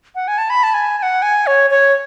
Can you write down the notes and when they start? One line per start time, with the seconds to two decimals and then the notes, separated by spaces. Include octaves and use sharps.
0.15 F#5
0.28 G#5
0.38 A5
0.50 B5
0.63 A5
0.74 G#5
0.98 G#5
1.03 F#5
1.22 G#5
1.47 C#5
1.71 C#5